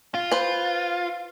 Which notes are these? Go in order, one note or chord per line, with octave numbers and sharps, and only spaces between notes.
F4
B4 C5